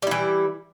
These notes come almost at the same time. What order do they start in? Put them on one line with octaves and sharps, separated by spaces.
G3 E4 E3